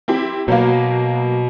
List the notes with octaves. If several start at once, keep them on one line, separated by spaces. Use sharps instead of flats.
C4 E4 G4
B2 F#3 A#3